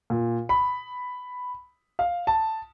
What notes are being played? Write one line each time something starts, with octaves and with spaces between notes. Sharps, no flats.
A#2
B5
F5
A5